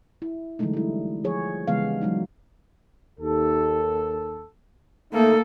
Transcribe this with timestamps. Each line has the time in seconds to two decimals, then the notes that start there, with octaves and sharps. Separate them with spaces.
0.22 E4
0.59 D3 E3 F#3 G#3 A3 D#4
0.73 G3 E4
1.24 F3 G#4 C#5
1.68 C#3 E3 G3 G#3 B3 F5
2.02 F#3 G#3 D#4
3.19 D#2 A4
5.13 A3 A#3 D#4 A4